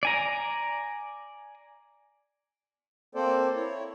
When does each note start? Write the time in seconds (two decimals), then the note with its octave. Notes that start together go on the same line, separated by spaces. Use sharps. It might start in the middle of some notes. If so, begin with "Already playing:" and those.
0.03 D5 G#5 A#5
3.15 A#3 C4 A4 C5 D5
3.55 E4 C#5